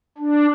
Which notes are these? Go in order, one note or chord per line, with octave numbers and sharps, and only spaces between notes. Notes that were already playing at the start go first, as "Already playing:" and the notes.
D4